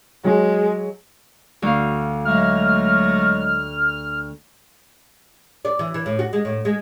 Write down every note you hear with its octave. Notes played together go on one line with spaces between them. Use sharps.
F#3 G#3
D2 F5
F#3 G#3 A3 F6
D5
E3
E3
A2
F#4
G#3
A2
G#3